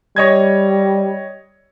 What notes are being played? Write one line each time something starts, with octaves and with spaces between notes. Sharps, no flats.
G3 C#5 D#5 G#6